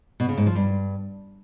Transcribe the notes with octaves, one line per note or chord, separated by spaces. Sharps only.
B2
C#3
G#2
F3
G2